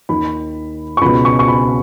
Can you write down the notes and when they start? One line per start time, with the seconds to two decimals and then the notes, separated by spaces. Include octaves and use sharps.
0.09 D#2 D#3 B5
0.97 C#6
1.02 C#2 B2 B5
1.25 C#6
1.39 C#6
1.48 B5